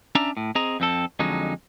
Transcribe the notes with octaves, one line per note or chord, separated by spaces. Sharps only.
C#4 D4 D5 E5 A#5
A2
C4 G#4 D#5 A#5
F2 C4 A4
F2 D3 F#3 G#3 D#4